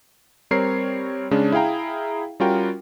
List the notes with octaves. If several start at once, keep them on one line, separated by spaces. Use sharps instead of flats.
G3 C4 A#4 C#5 C7
C#3 G#3 C#4 D4
E4 G#4 F5 G5 A#5
G3 C#4 F4 F#4 A#4 G5